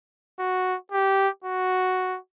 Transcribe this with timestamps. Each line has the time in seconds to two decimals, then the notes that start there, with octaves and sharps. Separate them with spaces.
0.39 F#4
0.92 G4
1.44 F#4